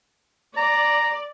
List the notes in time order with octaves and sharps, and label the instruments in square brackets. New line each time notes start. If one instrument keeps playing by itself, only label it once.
[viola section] D5 [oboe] A#5